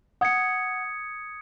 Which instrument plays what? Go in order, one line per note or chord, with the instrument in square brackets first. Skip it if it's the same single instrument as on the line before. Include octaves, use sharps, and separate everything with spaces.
[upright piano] F#5 [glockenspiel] D#6 G#6 C#7